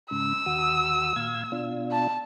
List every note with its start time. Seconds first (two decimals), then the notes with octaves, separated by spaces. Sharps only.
0.11 G#2 C#3 E6
0.46 D#2 F#4 D#6
1.16 A#2 F5 G#6
1.52 B2 D4 F4
1.92 A5